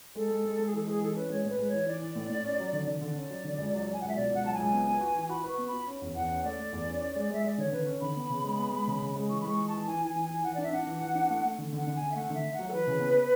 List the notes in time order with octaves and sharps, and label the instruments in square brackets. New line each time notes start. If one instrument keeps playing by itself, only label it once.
[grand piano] G#3 [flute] A4
[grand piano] G#3
G#3
G#3
[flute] G#4
[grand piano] E3 [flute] A4
[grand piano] G#3 [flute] G#4
[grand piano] E3 [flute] A4
[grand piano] C#4 [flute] B4
[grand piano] G#3 [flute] C#5
[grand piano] A2 [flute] B4 C#5
[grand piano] G#3
[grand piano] E3 [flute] C#5
[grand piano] E3 [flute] D5
[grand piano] E3
A2
A2
C#4
F#3
D3
D3
[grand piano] D3 [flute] D5
[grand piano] C#4
F#3
D3
C#2
F#3
F#3
[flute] G#5
[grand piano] C#2 [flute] F#5
[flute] E5
[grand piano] B2 [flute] D5
[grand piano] C#2 [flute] F#5
[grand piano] F#3 [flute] A5
[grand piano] C#2 [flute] G#5
[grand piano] B3
B4
F#4
E3
[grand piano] F#4 [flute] B5
[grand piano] B4 [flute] C#6
[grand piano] B3
[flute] B5
[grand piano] F#4
C#4
E2
[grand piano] E2 [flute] F#5
[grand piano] C#4
[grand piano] A3 [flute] D5
[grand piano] A3
E2
C#4
C#4
G#3
[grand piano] G#3 [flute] E5
[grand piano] G#3 [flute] D5
[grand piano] D3 [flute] C#5
[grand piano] D3 [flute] B4
[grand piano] C#4
[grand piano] D3 [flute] B5
[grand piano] B3
C#3
G#3
B3
G#3
C#3
C#3
G#3
[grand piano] E3 [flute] C#6
[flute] B5
[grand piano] G#3 [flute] C#6
[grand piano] E3
[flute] A5
[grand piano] E3
[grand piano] E3 [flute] G#5
[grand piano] E3 [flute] G#5
[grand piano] E3
[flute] G#5
[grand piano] E3
[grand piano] E3 [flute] F#5
[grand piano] D4 [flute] D5
[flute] E5
[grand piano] D4 [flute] F#5
[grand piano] E3
E3
D4
A3
A3
D3
[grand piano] D3 [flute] F#5
[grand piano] D3
[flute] G#5
[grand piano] D3
[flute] E5
[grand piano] A3 [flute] F#5
[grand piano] D3 [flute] E5
[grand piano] A3
[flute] F#5
[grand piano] F#3
[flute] A4
[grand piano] E3 [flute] B4
[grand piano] C#3
B3